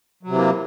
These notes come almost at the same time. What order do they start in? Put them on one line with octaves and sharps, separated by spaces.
F#3 C3 E3 A#3